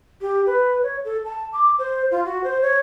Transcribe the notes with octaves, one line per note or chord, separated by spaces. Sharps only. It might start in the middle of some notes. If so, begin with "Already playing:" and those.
G4
B4
C#5
A4
A5
D6
C5
F4
F#4
C5
C#5